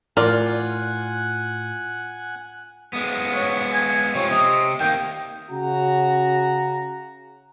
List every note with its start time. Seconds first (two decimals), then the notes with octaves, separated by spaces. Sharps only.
0.17 A2 F4 A#4 D5 F#5 G#5 F#6
2.93 G#3 B3
3.34 C#5
3.73 G#5
4.15 C3 F3 C#5
4.31 C3 D#5
4.80 D#3 A#3 G5
5.50 C#3 F#4 A#5